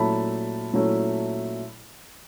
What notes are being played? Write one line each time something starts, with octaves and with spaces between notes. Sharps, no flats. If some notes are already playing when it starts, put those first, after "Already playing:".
Already playing: A#2 F#3 A3 C#4 E4 A5 B5
A#2 F#3 A3 C#4 E4